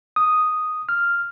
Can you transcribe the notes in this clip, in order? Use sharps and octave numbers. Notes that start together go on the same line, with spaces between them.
D#6
F6